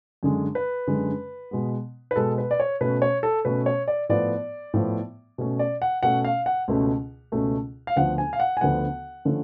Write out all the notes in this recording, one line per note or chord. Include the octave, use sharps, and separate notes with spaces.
F#2 D3 G#3
B4
F#2 D3 G#3
B2 G#3 B3
B4
B2 G#3 B3 A4
B4
D5
C#5
B2 A3 C#4 B4
C#5
A4
B2 A3 C#4 B4
C#5
D5
A2 F3 B3 D5
A2 F3 B3
B2 A3 C#4
D5
F#5
B2 A3 C#4 F#5
F5
F#5
C#2 B2 A3 C#4
C#2 B2 A3 C#4
F5
D2 D3 F3 B3 F#5
G#5
F5
F#5
G#5
D2 D3 F3 B3 F#5
D3 F3 A3 C#4